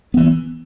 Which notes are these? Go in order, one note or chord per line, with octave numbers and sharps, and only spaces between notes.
E3 B3